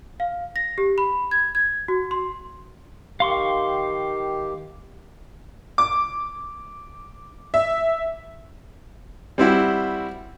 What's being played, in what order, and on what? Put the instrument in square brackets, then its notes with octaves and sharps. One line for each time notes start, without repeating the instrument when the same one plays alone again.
[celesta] F5
A#6
G4
B5
G#6
G#6
F#4
C6
[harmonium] D#3 G4 [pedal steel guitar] F5 C6 C#6
[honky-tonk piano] D6
E5
[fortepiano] G3 C4 E4 F#4